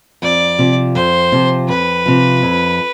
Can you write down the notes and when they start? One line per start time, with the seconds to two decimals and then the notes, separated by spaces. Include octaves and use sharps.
0.22 F2 D5
0.59 C3 F3
0.95 F2 C5
1.32 C3 F3
1.68 F2 B4
2.06 C3 F3
2.42 F2